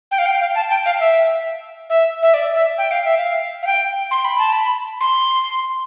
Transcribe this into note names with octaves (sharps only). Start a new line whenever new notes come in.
G5
F5
G5
F5
A5
G5
F5
E5
E5
E5
D5
E5
G5
F5
E5
F5
F5
G5
C6
B5
A5
B5
C6